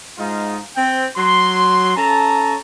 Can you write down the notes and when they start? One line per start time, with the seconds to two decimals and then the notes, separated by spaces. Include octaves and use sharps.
0.18 G#2 G#3 D#4 F4
0.76 C4 G5
1.16 F#3 C6
1.96 C#4 A4 A5 A#5